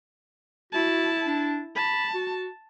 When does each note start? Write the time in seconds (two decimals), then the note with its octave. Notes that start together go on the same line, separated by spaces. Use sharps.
0.73 E4 F#4 A5
1.27 D4
1.76 A5 B5
2.15 F#4